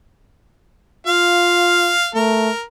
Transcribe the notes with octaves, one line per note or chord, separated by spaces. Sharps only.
F4 F5
A3 A#4